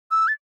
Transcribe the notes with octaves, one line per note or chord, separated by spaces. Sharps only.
E6
A6